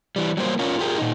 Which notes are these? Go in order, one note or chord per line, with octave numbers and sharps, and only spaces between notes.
E3 G3
F#3 G3 A#3 C5
C#4 F4 A#4
F4 G4 G#4 A#4
A#2 D#4